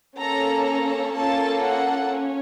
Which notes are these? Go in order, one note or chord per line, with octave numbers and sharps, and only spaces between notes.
A#3 C#4 A4 A#5
A#5
A#3 C#4 F4 A4 A5
F#5
C#4